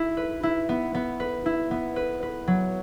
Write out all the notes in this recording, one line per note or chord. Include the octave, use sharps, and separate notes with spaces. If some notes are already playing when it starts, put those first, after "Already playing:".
Already playing: E4
B4
E4
B3
B3
B4
E4
B3
B4
B4
F#3